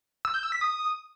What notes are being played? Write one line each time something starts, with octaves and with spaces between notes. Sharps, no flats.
E6
G6
E6
B6
D#6